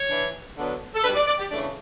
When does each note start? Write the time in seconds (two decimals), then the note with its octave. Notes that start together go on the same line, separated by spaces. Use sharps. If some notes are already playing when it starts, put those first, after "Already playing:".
Already playing: C#5
0.09 E3 B3 D4
0.56 D3 F#3 B3 D4
0.94 A4
1.04 B2 G3 D4 B4
1.15 D5
1.27 D5
1.39 G4
1.50 C#3 E3 A3 D4 D5